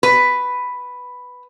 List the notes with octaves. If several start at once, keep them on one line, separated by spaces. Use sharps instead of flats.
B4